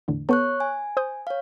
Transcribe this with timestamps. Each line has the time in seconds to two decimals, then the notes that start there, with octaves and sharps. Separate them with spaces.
0.08 E2 A2 D3
0.29 B3 A4 C#5 C#6 F#6
0.60 G#5
0.97 C5 D#6 G6
1.27 C#5 F5